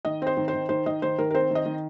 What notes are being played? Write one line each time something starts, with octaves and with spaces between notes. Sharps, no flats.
D#3 D#5
C4 C5
D#3
C5
D#3
D#3 C5
D#3 D#5
D#3 C5
D#3 A#4
A#4
C4 C5
D#3 D#5
D#3